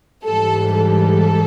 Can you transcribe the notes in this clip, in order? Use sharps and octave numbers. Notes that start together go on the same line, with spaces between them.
G#2 E3 G3 A4
A4